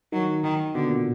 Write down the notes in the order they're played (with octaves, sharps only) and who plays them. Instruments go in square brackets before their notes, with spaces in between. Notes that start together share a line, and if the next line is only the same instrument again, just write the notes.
[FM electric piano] D#3 [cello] F#3
[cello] D#3
[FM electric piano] B2 [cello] D3
[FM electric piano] A#2